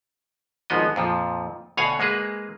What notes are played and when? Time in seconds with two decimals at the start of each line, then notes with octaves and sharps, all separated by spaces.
0.70 G#1 G#2 F3 B3 D#5
0.96 F2 A#2 F3
1.77 D2 B2 C#5 F5 F#5 G#5
2.00 G#3 A#3 G#4 B4